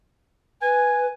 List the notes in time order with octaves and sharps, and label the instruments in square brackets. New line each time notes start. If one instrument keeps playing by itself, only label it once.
[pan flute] B4 [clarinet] G#5